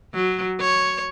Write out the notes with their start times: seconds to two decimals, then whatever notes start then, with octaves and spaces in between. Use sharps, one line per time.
0.14 F#3
0.61 C#5